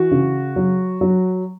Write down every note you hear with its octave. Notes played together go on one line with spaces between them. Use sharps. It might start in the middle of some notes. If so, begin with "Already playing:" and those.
Already playing: E3 F#4
C#3
F#3
F#3